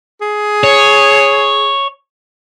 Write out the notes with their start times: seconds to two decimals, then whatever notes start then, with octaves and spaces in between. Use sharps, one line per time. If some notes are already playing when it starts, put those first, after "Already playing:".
0.21 G#4
0.64 C#5